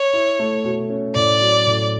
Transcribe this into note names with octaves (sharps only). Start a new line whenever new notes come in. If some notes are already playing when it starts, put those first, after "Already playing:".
Already playing: C#5
E4
A3
B2
C#4
A2 D5
F#3
A2